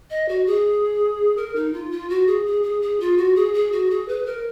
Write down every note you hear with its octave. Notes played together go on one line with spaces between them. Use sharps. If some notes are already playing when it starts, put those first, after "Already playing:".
D#5
F#4
G#4
A#4
D#4
F4
F4
F#4
G#4
G#4
G#4
G#4
F4
F#4
G#4
G#4
F#4
G#4
B4
A#4